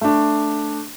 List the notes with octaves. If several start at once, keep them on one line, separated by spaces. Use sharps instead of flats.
A3 D4